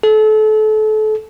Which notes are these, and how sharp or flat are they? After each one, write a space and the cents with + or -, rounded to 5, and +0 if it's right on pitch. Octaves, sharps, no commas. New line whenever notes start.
A4 -30